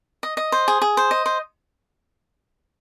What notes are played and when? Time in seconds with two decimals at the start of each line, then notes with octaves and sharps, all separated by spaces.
0.23 D#5
0.37 D#5
0.52 C5
0.68 G#4
0.82 G#4
0.97 C5
1.11 D#5
1.26 C5